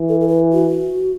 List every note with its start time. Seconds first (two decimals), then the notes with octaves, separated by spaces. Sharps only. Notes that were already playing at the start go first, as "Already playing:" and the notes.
Already playing: E3
0.09 A4
0.20 A4
0.28 B4
0.53 F#4